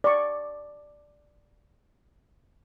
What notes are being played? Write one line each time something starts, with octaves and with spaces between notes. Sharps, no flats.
D5 C#6